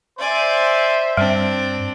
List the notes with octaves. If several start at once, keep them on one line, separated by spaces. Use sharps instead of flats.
C5 D5 E5 G#5
G2 G3 C4 D4